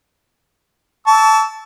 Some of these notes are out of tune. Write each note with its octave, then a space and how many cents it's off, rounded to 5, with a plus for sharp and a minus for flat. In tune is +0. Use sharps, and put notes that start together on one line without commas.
A5 -5 C#6 +40 E6 -10